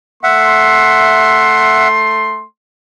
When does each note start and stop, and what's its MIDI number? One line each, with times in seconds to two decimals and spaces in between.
0.24 2.45 57
0.24 1.88 76
0.24 1.88 78
0.24 2.45 84